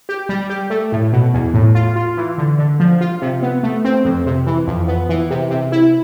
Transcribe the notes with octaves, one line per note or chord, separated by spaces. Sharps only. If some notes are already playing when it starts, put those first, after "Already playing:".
G4
G3
G4
A3
A2
B2
E2
A2
F4
F4
E3
D3
D3
F3
F4
C3
B3
A3
C4
F2
C3
E3
F2
B3
E3
C3
C3
E4